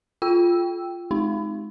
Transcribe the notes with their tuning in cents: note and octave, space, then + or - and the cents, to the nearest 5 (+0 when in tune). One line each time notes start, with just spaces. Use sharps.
F4 +0 G5 +0 E6 +0
G#3 +30 D#4 +0